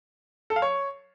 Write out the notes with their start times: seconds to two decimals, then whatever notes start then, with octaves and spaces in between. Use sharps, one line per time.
0.50 A4
0.56 F5
0.62 C#5